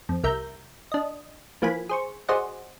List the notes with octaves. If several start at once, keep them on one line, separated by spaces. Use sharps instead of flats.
F2
C2 A#4 E5 A#5 G6
D4 D#5
E3 F3 A#3 B4 G#5 B5
G#4 C5 C#6
F#4 G#4 C5 D5 D#5 F#5